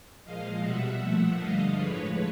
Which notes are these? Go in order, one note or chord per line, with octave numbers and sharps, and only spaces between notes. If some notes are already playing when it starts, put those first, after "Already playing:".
A#2 F3 G#3 D#5 F5
B2 G3 E5 F#5
A#2 F3 A3
G2 D3 G3 D#5 F5
A2 F3 G#3 B4 C#5